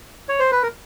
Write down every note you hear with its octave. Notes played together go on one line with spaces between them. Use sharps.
C#5
C5
B4
A#4